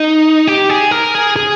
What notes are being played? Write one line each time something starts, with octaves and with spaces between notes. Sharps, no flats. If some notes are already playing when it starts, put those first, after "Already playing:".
Already playing: D#4
G4
G#4
A#4
G#4
G#4